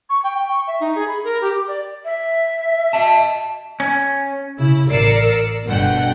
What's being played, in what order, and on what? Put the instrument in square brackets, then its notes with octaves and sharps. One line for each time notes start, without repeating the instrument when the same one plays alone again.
[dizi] C#6
G5
G5
C#6
E5
D#4
G#4
B5
A#4
G4
D6
D5
[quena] E5
[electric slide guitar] D#5 A5
C#4
[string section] C#3 E4
A1 A#4 D5 E6 C7 C#7
G1 B2 D3 F#5 G5